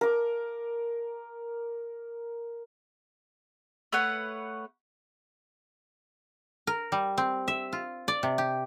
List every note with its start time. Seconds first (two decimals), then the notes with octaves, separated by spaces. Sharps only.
0.01 A#4 D6
3.92 A3 B4 C#5 F#5
6.67 A#4
6.92 G3
7.18 C4
7.48 E5
7.73 F4
8.08 D5
8.23 C3
8.38 G4